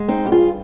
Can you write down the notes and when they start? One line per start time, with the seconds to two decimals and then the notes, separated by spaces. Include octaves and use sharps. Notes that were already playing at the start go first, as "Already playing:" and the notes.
Already playing: G#3
0.08 C4 D#4
0.25 G2 G4
0.32 F4 G#4